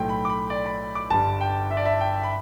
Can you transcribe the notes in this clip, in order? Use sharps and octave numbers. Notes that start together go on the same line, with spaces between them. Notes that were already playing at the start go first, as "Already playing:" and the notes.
Already playing: B1 A2 A3 G5
B5
D6
B5
D5
B5
D6
G1 G2 G3 A5
G5
E5
D5
E5
G5
B5